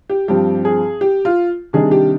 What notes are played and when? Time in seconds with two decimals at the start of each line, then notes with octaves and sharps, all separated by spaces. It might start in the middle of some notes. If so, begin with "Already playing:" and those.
0.10 G4
0.28 G2 F3 C4 G4
0.65 G#4
1.01 G4
1.25 F4
1.73 C3 D#3 G3 D4 G#4
1.91 G4